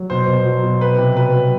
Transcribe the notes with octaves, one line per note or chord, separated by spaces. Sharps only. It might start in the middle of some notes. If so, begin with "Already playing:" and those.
Already playing: F#3
B2 C5
B2
F#3
B2
C3 B4
C3
F#3 B4
F#3